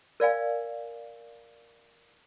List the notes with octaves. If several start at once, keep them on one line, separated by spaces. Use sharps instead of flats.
A#4 D5 F5 G#5